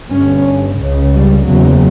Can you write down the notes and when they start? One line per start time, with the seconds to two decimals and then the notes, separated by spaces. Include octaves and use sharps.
0.11 G1 G2 C#4
0.79 C#2 C#3
1.14 G3
1.48 F#1 E2 C#3 F#3